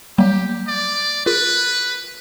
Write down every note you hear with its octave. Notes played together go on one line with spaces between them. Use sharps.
F#3 G3 A#3 G4
D5
F4 G#4 A#4 B4